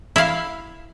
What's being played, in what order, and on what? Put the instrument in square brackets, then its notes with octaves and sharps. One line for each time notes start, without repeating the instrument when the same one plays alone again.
[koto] E4 F5